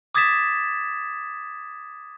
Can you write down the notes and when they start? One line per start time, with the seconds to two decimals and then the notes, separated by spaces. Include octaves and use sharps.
0.15 D6 D#6 G#6 A6 B6 E7